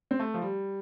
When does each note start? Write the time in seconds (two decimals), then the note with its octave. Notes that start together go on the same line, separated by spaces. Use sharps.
0.11 C4
0.19 A3
0.34 F3
0.42 G3